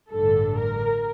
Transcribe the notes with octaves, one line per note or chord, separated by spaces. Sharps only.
A1 G2 D3 A4
A#4